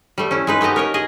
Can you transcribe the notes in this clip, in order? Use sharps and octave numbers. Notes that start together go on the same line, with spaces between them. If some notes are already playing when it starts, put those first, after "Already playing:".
G3 A3
C#4 E4
G#3 D#4 B4
A3 B3 G4 D#5 A#5
A#4 C#5 D#5
G#4 D#5